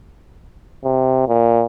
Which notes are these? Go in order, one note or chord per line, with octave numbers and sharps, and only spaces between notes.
C3
A#2